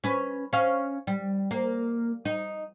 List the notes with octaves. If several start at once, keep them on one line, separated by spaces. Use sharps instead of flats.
C#4 B4
C#4 F5
G3
A#3
D#4